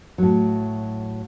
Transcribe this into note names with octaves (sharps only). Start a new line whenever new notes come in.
A2 F#3